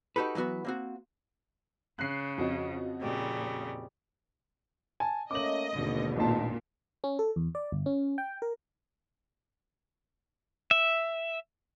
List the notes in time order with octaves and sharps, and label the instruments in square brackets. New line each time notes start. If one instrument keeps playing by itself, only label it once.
[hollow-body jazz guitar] D#4 F#4 G4 A4 B4
E3 F#3 B3 F#4 B4
A#3 C4 F#4
[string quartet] C#3 [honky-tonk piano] F#6 C7
[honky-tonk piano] F2 F#4 D#5
[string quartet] A#2 C#3 G3
[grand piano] G#5 A5
[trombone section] A3 A#3 C#4 [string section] D#5 [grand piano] D6 F#7
[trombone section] G#1 [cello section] D#2 B2 D3
[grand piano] A1 D#4 A5 [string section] A#2
[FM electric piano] C#4
A4
E2
D5
G1
C#4
G5
A#4
[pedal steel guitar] E5